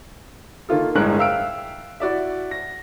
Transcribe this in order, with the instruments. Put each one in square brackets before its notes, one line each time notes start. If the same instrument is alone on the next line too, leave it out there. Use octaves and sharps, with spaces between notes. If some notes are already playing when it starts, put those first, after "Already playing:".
[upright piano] D#3 A#3 F4 A4
G1 A2 G#3 A#4 F#6
E5 F5 G5 E6 F6 D7
E4 F#4 D5 E5
A#6